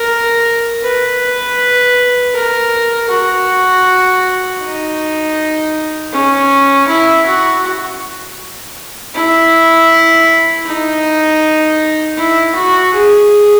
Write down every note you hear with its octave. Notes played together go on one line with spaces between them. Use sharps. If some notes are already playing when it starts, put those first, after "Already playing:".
Already playing: A#4
B4
A#4
F#4
D#4
C#4
E4
F#4
E4
D#4
E4
F#4
G#4